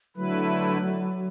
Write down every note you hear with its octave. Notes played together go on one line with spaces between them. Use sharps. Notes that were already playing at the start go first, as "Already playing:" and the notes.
D3 F#3 A3 E4 B4